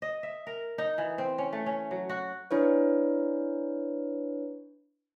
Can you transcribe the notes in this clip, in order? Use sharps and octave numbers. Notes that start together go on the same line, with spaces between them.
D#5
E5
A#4
D#4
E3
C4
C#4
A3
C#4
F#3
F#4
D4 E4 B4 C#5